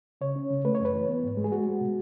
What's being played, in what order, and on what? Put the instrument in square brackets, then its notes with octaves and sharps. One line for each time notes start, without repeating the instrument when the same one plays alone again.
[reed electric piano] C#3 C#5
C#4
C#3
A3 B4
C#5
F#2
B4
E3
B3
G#2
G#3
G#4
G#3 F#4
G#3
B2